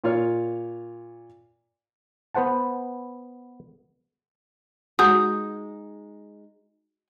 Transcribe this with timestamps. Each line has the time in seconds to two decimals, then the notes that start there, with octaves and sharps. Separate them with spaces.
0.04 A#2 F4 C#5 F6
2.35 B3 B4 C5 F#5 A5
4.99 G#3 D#4 F#4 G#4 D#6 G6